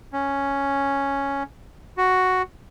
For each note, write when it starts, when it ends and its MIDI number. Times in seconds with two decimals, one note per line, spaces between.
0.13 1.43 61
1.97 2.42 66